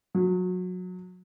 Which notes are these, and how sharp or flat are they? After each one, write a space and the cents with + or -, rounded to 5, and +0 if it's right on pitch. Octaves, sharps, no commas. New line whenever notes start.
F#3 -25